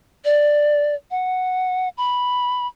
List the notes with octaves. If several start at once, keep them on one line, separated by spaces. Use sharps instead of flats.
D5
F#5
B5